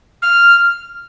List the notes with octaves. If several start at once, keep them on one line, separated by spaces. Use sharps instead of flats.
F6